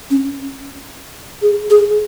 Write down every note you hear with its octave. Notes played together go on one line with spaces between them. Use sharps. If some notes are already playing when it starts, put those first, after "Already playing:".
C#4
G#4
G#4